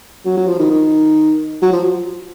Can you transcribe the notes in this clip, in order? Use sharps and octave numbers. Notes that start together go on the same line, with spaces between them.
F#3
F#3
F3
D#3
D#3
F#3
F3